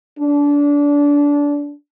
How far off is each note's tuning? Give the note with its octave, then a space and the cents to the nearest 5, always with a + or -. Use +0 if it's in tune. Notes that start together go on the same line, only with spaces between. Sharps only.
D4 -25